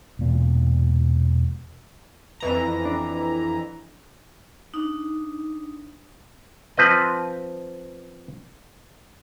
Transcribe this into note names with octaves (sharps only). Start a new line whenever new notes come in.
E1 A#2
F2 E3 A#5
D4
D4 D#4
F3 C4 B4 D#5